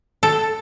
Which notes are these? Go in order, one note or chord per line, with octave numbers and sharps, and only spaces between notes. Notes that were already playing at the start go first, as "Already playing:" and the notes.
A4